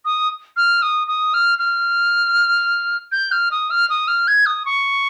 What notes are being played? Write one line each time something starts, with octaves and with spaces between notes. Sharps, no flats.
D#6
F6
D#6
D#6
F6
F6
G6
F6
D#6
F6
D#6
F6
G#6
D#6
C#6